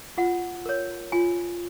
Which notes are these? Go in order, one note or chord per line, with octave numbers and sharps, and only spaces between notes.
F4 F#5
A#4 C#5
F4 G#5